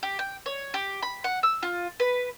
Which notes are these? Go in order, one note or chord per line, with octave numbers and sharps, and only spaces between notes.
G4
G5
C#5
G4
B5
F#5
E6
F4
B4